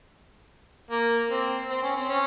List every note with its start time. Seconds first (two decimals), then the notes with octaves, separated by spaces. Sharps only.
0.91 A#3
1.31 C4
1.70 C4
1.83 C#4
1.96 C4
2.09 C#4